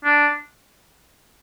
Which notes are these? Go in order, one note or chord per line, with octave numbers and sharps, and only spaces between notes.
D4